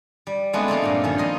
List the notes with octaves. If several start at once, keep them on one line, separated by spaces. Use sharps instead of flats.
G3
G#3 A3 B3 C4 D4
F3 A#3 C4 A4
G2 A#2 D#4
D#3 F3 C#4 A4
A#3 D#5 C6